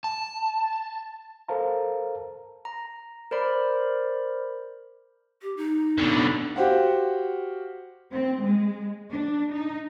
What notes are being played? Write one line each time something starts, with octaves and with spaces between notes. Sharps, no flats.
A5
A4 A#4 C5 F5 A5 A#5
A#5
A#4 C5 D5 B5
G4
D#4
B2 D3
F#4 G4 C5 F5 F#5
C4
G#3
D4
D#4